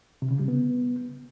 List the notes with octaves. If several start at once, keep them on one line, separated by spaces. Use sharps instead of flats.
C3
C#3
G3
B3